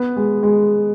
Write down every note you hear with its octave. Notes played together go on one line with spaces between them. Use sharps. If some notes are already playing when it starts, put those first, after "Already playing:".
Already playing: B3
G#3
G#3